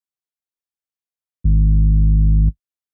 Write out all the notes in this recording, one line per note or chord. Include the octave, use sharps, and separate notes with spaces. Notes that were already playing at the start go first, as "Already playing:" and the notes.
G#1